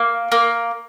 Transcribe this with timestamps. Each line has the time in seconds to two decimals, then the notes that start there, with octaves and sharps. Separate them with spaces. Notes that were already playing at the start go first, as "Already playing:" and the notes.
Already playing: A#3
0.32 A#3